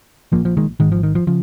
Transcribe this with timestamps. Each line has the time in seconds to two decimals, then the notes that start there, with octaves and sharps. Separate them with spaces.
0.32 A#1 F3 A#3
0.36 A#2
0.45 F3
0.57 D#3 G#3
0.80 G#2 D#3 G#3
0.85 G#1
0.92 F3
1.03 D#3
1.15 F3
1.27 C#3 F3